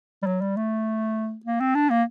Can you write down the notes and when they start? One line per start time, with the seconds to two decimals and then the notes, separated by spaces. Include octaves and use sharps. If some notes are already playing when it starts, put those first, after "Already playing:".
0.23 G3
0.27 F#3
0.41 G3
0.56 A3
1.45 A#3
1.60 C4
1.75 D4
1.90 A#3